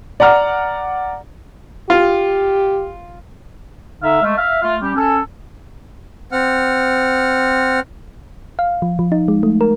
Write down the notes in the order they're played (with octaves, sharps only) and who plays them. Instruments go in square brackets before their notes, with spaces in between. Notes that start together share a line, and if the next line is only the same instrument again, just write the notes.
[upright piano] D5 F#5 A#5 F6
[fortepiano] F4 [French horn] G4
[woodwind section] D3 D#4 E5 F5
G#3 A3
E5 F5
A3 F4
G3 C#4 G4
C#4 A4
[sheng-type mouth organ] C4 F#5 F6
[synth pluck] F5
F3
F3
D#4
G#3
A3
A#4